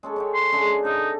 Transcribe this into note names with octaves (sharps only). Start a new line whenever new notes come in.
G#3 C#4 A4
C#4 C#5 G5
C6
C#3 G#3 D4
C3 D#4 A4 E5